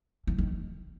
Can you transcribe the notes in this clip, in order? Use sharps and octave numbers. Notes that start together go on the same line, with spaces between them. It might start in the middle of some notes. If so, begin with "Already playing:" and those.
E3
D#3